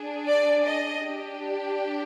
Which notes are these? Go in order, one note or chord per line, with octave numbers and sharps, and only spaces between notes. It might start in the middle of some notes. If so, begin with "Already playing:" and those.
Already playing: D4 G#4
D5
D#5
D4 G4